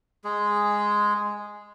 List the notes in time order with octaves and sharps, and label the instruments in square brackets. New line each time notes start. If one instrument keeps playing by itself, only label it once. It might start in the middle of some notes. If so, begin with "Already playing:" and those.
[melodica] G#3 G#4